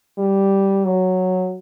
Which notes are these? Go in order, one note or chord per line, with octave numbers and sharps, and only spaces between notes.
G3
F#3